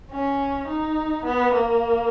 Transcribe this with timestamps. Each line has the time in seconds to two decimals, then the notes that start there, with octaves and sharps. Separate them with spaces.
0.11 C#4
0.68 D#4
1.25 B3
1.54 A#3